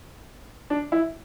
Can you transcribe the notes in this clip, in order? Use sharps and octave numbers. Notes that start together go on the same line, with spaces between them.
D4
E4